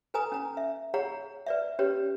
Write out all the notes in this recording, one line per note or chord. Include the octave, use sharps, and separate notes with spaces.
A4 B4 G#5 A#5 D#6
C#4 A#5
E5
G#4 C#5 F#5 A#5
B4 D5 E5
C#4 G4 B4 C#5